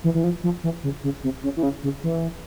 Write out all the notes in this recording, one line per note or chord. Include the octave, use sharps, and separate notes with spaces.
E3
E3
F3
F3
E3
C#3
C#3
C3
C#3
E3
C#3
C#3
E3